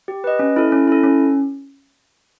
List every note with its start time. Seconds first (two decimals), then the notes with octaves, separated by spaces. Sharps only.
0.08 G4
0.24 B4 D#5
0.39 C#4
0.56 E4 A4
0.72 C#4
0.88 E4 A4
1.03 C#4